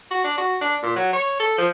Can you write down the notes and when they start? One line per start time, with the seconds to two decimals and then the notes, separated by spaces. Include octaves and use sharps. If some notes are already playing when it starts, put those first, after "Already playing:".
0.11 F#4
0.24 D4
0.38 F#4
0.61 D4
0.83 A#2
0.96 F#3
1.13 C#5
1.40 A4
1.58 F3